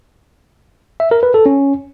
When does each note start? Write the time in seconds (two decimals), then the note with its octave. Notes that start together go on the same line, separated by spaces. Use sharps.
1.00 E5
1.11 A#4
1.23 B4
1.34 A4
1.46 C#4